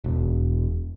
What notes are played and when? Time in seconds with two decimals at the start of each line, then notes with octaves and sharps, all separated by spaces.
0.04 E1